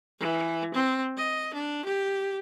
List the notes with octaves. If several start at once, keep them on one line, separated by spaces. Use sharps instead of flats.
E3
C4
D#5
D4
G4